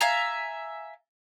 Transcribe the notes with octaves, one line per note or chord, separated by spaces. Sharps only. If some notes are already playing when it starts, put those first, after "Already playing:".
E5 F5 G#5 A#5